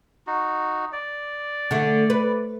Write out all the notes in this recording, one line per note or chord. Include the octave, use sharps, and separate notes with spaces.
D#4 F#4
D5
D3 A3
B4